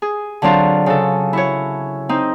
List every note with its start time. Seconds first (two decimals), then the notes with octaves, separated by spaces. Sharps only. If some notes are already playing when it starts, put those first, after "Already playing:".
0.02 G#4
0.42 D3 F#3 C4 D4 F4
0.86 C#3 A4
1.33 E4 F#4 C#5
2.09 C4 D#4